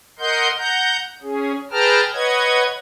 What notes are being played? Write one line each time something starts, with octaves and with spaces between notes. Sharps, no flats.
A#4 D#5 F#5 C6 G6
F#5 A#5 G6
C#4 G#4
G#4 B4 G5 A5 A#5 F6
B4 C#5 D#5 F#5 G#6